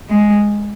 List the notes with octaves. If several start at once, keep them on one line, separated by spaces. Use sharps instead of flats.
G#3